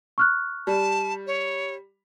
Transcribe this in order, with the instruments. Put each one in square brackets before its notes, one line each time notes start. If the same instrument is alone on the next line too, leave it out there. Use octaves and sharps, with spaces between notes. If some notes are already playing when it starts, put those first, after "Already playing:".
[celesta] C#6 F6 F#6
[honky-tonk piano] G3 [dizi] A5
[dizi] C#5